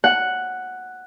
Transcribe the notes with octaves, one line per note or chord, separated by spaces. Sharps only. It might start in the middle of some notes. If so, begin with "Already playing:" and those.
F#5